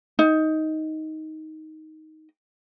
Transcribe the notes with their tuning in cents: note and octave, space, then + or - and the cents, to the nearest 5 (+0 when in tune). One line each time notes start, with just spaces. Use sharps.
D#4 +10